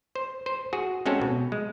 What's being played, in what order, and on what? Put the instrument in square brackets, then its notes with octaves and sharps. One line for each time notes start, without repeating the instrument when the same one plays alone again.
[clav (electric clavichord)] C5
C5
F#4 G#4
G#3 C4 C#4 F#4 A4
B2
G#3